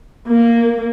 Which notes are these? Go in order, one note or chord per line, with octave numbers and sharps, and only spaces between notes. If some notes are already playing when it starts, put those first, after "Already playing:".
A#3